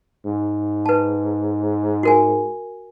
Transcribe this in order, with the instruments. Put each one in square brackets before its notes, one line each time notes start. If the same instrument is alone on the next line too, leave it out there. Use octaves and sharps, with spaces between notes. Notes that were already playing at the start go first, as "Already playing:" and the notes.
[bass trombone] G#2
[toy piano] B4 A5
F#4 A#4 G#5